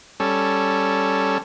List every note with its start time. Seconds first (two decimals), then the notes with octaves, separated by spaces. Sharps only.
0.20 G3 C#4 A4